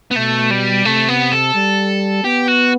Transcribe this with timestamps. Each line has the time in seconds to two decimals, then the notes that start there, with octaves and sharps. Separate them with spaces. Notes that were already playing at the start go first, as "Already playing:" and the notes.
0.11 B3
0.16 B2 A3
0.51 G3
0.85 C3 A3
1.08 B3
1.32 A4
1.54 G3
2.24 B3 G4
2.48 F#4